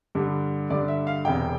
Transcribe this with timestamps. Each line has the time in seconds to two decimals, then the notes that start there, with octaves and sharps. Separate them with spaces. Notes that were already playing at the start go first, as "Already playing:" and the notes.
0.15 G2 D3 G3
0.70 G2 D3 G3 D5
0.88 E5
1.07 F5
1.25 E1 E2 C3 G5